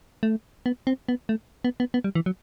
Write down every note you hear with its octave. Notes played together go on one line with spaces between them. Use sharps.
A3
B3
C4
B3
A3
B3
B3
B3
G3
E3
F#3